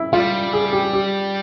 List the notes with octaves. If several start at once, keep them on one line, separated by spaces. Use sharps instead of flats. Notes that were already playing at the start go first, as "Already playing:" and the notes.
Already playing: E4
G3 F4
G#4
G4
G4